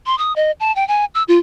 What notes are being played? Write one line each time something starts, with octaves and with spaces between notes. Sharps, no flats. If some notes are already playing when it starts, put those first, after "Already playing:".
C6
D#6
D#5
A5
G5
G#5
E6
F4